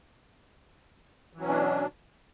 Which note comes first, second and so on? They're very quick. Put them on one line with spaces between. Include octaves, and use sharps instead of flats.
E3 F#3 C#4 B2 D4